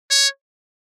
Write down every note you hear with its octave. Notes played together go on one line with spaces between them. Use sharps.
C#5